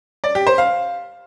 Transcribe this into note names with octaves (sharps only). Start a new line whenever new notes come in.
D5
G4
C5
F5